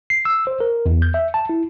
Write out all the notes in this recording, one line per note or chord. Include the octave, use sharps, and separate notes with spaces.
C7
E6
C5
A#4
E2
G6
E5
A5
E4